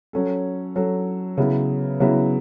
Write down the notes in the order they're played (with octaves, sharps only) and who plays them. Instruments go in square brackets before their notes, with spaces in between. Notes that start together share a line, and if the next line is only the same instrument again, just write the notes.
[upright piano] F#3 C#4 A4
F#3 C#4 A4
C#3 F#3 B3 E4
C#3 F#3 B3 E4